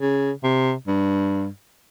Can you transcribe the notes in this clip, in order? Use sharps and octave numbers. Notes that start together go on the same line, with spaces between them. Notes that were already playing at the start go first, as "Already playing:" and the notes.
C#3
C3
G2